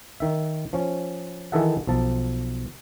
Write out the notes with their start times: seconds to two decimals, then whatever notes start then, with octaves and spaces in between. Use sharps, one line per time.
0.20 D#3 E5
0.73 F3 C#4
1.52 D#3 E3 G#4 A4 E5 F#5
1.87 B1 F3 A5